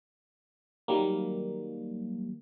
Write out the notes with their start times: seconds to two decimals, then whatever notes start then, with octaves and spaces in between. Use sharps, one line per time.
0.88 D#3 F#3 G3 A#3